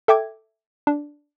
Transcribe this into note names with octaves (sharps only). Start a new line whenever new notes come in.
A4 E5 G5 D6 G#6
D4